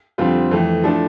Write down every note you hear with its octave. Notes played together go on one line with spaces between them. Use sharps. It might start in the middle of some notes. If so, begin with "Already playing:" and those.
F2 D3 G3 C4 F4
F2 E3 A3
A2 F3 A3 D4 A4